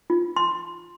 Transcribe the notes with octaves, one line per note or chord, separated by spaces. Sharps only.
F4
C6